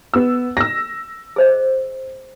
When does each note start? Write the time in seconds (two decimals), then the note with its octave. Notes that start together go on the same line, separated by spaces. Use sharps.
0.14 B3 E6
0.57 E6 A#6
1.36 G#4 C5 D#5